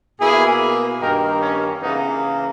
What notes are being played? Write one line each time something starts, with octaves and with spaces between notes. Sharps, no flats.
B2 A#3 E4 G#4
G2 D#3 A#3 G4 A#4
C#4
C#3 E3 A#3 B3 D#4